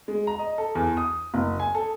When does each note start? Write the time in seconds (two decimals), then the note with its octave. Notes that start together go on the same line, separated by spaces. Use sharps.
0.08 G#3
0.27 A#5
0.39 D#5
0.58 A4
0.75 E2
0.97 D#6
1.34 F#1
1.60 G#5
1.75 A4